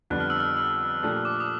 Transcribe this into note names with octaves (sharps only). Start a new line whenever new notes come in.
F2 D3 G3 B3 D4 F#6
F6
E6
F6
E6
A#2 F3 A3 D4 G4
D6
D#6